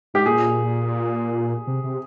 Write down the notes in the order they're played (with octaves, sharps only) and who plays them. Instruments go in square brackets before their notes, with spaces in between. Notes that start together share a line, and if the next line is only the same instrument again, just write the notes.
[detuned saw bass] G#2 [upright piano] G4
[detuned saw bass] A#2 [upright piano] G#4
[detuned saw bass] C3
C3